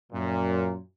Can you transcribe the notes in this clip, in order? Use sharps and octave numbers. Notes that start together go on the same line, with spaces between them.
F#2 A#2